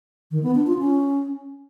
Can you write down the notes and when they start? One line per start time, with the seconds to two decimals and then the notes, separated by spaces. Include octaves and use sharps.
0.31 D#3
0.43 B3
0.55 D4
0.67 F4
0.79 C#4